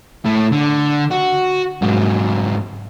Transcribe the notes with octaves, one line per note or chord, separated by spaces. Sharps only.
A2 A3
D3
F#4
G#2 F#3